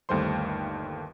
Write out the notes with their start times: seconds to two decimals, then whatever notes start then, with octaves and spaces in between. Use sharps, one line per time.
0.09 G1 D#2 G3 A3 C5 C6